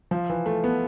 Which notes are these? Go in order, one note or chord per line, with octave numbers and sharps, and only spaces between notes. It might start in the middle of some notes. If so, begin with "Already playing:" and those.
F3
E3
A3
B3